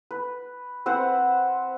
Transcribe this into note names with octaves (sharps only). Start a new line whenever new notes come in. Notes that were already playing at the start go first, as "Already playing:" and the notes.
B4
C4 B4 C5 F#5